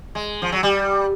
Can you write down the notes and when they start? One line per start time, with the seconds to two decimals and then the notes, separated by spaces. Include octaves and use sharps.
0.15 G#3
0.42 F3
0.52 F#3
0.63 G3